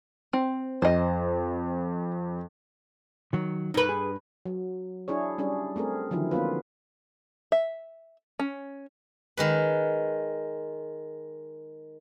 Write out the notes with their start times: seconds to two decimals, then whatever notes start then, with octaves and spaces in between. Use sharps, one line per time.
0.33 C4
0.82 F2 C5 D#5
3.33 D#3 F#3
3.74 G2 D#4 A#4 B4
3.89 G#4
4.45 F#3
5.08 D4 E4 G#4 C#5
5.38 G3 C#4 D4 G#4
5.76 A3 C4 G#4 A#4
6.11 D3 D#3 F3 F#3 E4
6.31 A#3 B3 C#4 F4 B4
7.52 E5
8.39 C#4
9.37 D#3 G#3 B4